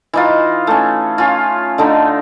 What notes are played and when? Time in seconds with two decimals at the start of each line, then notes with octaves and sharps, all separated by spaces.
0.13 E3 D#4 F4
0.67 A3 C#4
1.18 C#4 F4
1.78 D3 A3 D#4